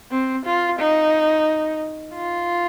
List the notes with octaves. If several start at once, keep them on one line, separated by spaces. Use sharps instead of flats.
C4
F4
D#4
F4